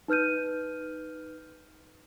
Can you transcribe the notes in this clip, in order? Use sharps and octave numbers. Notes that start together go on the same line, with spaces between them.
D#4 B4 F6 G6 D#7